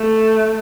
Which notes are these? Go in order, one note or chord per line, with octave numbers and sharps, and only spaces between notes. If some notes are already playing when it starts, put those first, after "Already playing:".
Already playing: A3